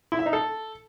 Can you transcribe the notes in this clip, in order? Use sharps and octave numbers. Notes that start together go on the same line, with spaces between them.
E4
E5
D#4
A4